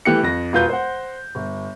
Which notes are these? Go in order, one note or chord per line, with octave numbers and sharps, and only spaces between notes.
E3 A3 G4 F#6 C#7
F2 A#6
E1 F4 B4 G6
C5 F#5
G1